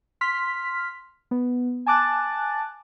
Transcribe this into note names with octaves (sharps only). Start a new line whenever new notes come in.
C6 F6 B6
B3
G#5 A5 D6 F#6 A6